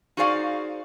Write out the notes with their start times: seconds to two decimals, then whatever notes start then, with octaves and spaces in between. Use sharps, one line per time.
0.17 D#4 F#4 G#4 C5 D5 F5